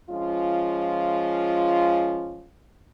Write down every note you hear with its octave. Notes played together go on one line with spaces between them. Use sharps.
F3 G#3 C#4 F4